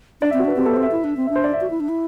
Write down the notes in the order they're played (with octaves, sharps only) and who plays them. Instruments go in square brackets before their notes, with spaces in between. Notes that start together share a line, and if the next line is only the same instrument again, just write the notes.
[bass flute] D4 [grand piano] D5
[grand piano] E5
[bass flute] C4
[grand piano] F#4
[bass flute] D4 [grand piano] B4
[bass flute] C4 [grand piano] G4
[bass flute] B3 [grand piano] A4
[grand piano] C5
[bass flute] C4
[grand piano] E5
[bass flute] E4
D4
C4
[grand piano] E5
[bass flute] D4
[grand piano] C5
D5
E5
[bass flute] F#4
E4
D4
E4